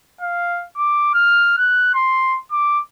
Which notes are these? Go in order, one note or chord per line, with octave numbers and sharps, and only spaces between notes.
F5
D6
F6
F#6
C6
D6